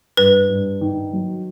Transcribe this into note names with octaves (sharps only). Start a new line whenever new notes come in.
G2 B4
G2
D#3
F#3